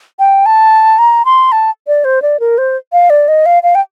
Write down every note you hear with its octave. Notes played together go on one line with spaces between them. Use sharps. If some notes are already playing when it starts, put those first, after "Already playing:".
G5
A5
A#5
C6
A5
D5
C5
D5
A#4
C5
F5
D5
D#5
F5
F5
G5